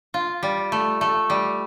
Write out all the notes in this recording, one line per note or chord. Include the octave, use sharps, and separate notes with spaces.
F4
G3
A3
A3
G3